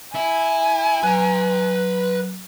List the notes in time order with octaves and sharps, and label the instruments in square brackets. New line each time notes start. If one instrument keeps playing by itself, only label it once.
[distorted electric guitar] E4 [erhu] G#5
[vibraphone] F#3 [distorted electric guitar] B4 A#5